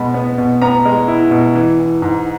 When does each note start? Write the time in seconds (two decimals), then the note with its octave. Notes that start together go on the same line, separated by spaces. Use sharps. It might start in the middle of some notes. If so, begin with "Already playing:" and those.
Already playing: B2 G#3 B5
0.14 B3
0.38 B2
0.62 B3 A#5
0.85 G#3
1.08 E4
1.31 B2
1.55 E3
1.78 E3
2.02 G#2